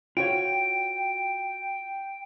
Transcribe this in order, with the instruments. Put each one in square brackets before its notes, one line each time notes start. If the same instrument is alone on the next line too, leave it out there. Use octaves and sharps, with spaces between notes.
[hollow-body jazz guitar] F4 F#4 C#5 [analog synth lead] G5 [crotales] D7